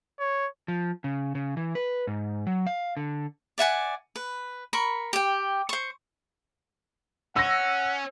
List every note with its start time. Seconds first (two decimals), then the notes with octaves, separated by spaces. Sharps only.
0.20 C#5
0.68 F3
1.04 C#3
1.35 C#3
1.57 E3
1.75 B4
2.07 G#2
2.47 F#3
2.67 F5
2.97 D3
3.58 D5 E5 F#5 G#5
4.16 B4
4.73 A#4 B5 C#6
5.13 G4 G5
5.69 C5 C#6
7.36 C#4 F#5 E6 A#6